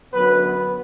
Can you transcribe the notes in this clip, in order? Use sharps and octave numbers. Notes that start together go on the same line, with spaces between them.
F#2 D3 F#3 B3 B4
B3 B4